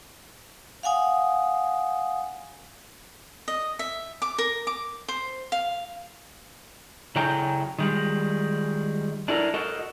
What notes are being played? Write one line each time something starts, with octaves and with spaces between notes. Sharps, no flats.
F5 F#5 G#5 D#6
D#5
E5
D6
A#4
D6
C5
F5
C#3 F#3 E4 A4 G5 A#5
D#3 G3 G#3
D4 E4 G4 A4 A#4
F#4 A4 A#4 D#5